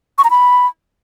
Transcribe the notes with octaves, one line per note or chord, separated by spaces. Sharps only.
C#6
A#5
B5